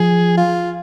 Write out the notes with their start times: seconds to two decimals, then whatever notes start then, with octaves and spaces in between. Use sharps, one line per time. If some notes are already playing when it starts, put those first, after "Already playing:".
Already playing: F3 G#4
0.38 F4